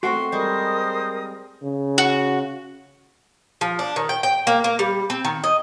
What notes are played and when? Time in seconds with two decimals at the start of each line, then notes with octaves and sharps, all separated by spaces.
0.03 A3 C4 F#4 C6
0.32 G3 G#3 A#4 C5 D#6
1.63 C#3
1.98 F#4
3.61 F3
3.79 D4
3.96 D#3
4.09 G5
4.23 G5
4.47 A#3
4.64 A#3
4.79 G3
5.10 C4
5.25 D#3
5.44 D#5